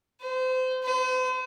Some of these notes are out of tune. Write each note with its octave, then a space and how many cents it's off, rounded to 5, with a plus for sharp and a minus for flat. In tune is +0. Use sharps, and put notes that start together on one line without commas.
C5 -30
C5 -40